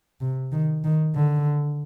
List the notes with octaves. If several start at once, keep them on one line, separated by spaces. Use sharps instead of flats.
C3
D#3
D#3
D3